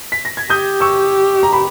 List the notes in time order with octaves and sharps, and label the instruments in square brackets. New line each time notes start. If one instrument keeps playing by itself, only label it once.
[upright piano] B6
A#6
G#6
[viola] G4 [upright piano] D#6 G6
[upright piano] C#6 E6
A#5
B5